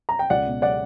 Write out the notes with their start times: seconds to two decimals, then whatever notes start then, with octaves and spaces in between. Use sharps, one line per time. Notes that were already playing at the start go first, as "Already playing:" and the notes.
0.09 A#5
0.19 G5
0.30 C#2 D5 F#5
0.47 B2
0.62 D5 F#5